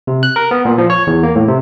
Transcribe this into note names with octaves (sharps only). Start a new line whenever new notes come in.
C3
F#6
A#4
B3
A#2
F3
C#5
E2
A#3
A2
C3